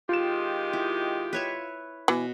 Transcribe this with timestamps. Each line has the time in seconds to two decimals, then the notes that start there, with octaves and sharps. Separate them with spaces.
0.09 D#3 G#3 F4 G4 E7
0.73 E4
1.33 B4 C#5 E5
2.08 B2 E3